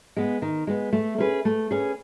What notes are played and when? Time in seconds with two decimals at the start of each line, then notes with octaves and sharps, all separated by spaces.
0.17 G#3 B3
0.42 D#3
0.67 G#3 B3
0.93 A3
1.18 C#4 G#4 B4
1.45 A3
1.71 C#4 G#4 B4